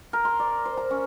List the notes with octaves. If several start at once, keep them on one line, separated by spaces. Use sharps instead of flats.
A#4
C6
D5
C5
A#5
C#4